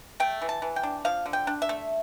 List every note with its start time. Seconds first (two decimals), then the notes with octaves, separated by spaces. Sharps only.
0.20 A3 G5
0.42 E3
0.49 A5
0.62 E3
0.76 G5
0.83 D4
1.05 F3 F5
1.26 D3
1.33 G5
1.47 D4
1.62 E5
1.69 A3